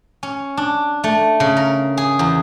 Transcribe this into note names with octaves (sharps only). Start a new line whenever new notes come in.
C#4
D4
A3
C#3
A#4
G#4
E2